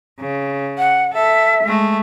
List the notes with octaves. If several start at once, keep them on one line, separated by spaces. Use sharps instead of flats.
C#3
F#5
A4 E5
G#3 A3